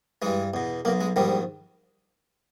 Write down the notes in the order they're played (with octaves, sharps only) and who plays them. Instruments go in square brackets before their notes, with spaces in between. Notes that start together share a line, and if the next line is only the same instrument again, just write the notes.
[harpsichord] G2 E3 G#3
E2 B2
B1 A#3
B2
G#3
A#1 G#2 D#3 G3